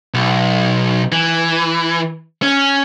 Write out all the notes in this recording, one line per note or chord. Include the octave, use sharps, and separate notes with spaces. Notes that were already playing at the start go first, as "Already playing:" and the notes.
B1
E3
C#4